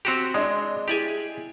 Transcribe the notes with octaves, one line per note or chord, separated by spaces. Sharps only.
C4 F#4 G4
G#3 D4 D#5
E4 G4 G#4 D5 G#5